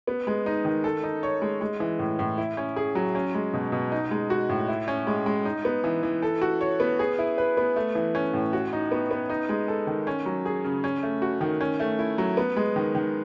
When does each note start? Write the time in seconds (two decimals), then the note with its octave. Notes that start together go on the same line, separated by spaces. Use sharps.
0.07 B3
0.27 G#3
0.46 D#4
0.65 D#3
0.84 A4
1.03 D#4
1.23 C#5
1.42 G#3
1.61 G#3
1.80 E3
1.99 A2
2.19 A2
2.38 E4
2.57 C#4
2.76 G#4
2.95 F#3
3.15 C#4
3.34 G#3
3.54 B2
3.72 B2
3.92 D#4
4.11 G#3
4.30 F#4
4.49 A2
4.68 E4
4.88 C#4
5.07 G#3
5.26 G#3
5.45 D#4
5.65 B3
5.84 E3
6.03 E3
6.22 A4
6.41 F#4
6.61 C#5
6.80 B3
6.99 G#4
7.19 E4
7.38 B4
7.57 B3
7.76 A3
7.95 E3
8.15 C#4
8.34 A2
8.53 F#4
8.73 D#4
8.91 B3
9.11 B3
9.30 D#4
9.49 G#3
9.68 A4
9.87 D#3
10.07 C#4
10.26 F#3
10.45 G#4
10.64 C#3
10.84 C#4
11.03 A3
11.22 F#4
11.41 D#3
11.61 C#4
11.80 A3
11.99 E4
12.18 F#3
12.37 B3
12.56 G#3
12.76 D#3
12.95 D#3